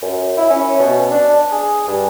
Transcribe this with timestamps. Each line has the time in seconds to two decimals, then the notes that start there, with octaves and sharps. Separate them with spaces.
0.02 F#2
0.38 E4
0.50 C#4
0.79 B2
1.11 D4
1.52 G#4
1.87 G2